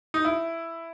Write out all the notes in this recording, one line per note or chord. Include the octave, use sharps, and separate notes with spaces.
D#4
E4